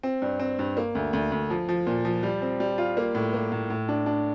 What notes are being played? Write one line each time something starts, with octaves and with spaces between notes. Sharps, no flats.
C4
G2
C4
G2
A#3
D2
D2
D2
F3
F3
A#2
F3
G3
C4
G3
F4
A#3
A2
A#3
A2
A2
D4
D4